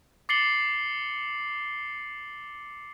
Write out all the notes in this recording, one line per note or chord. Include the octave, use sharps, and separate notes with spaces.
D6 A6 C7 C#7 F#7 G7